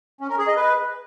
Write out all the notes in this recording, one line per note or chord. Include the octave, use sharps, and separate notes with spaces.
C#4
A#4
G#4
D#5
B4